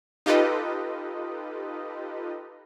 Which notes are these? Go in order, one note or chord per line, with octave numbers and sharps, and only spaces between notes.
D#4 F4 G4 A4 B4 D#5